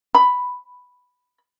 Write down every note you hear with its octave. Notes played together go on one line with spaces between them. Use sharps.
B5